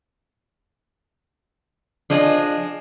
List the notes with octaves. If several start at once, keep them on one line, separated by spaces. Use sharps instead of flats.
F3 D4 G#4 D#5 G#5